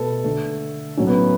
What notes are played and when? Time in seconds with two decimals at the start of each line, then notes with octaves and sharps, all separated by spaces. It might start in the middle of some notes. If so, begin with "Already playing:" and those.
Already playing: B2 A3 A4 B4
0.24 D3 A3
0.97 A2 F#3 A3 C#4
1.07 B3